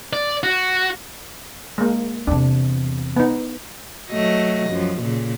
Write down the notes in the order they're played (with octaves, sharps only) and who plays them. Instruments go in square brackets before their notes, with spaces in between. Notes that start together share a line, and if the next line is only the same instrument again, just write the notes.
[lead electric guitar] D5
F#4
[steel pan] G#3 A#3
[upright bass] E2 C3 [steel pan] D4
[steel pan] B3 D#4
[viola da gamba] F#3 A3 D#5
F#2 F3
A#2 C#3